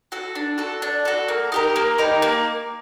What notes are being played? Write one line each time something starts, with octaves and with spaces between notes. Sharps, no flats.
F#4 A4
D4
F#4 A4
D4
F#4 A4
A#3
D#4 G4 A#4
A#3
D#4 G4 A#4
A#3